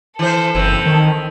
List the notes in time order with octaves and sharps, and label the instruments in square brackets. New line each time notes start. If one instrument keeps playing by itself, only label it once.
[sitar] E3 C5 [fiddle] A4
[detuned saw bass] F#1 [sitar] E3 C4
[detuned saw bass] D#3